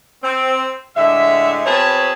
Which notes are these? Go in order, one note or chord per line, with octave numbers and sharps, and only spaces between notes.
C4
A2 D3 G#3 E5
B2 C4 G#4 C#5 A5 B5